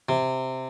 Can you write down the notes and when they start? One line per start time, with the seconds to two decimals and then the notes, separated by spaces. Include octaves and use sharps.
0.09 C3